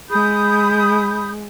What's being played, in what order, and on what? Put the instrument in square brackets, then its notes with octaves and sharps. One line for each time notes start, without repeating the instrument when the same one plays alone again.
[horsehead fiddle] G#3 [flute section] B5 D#6 G6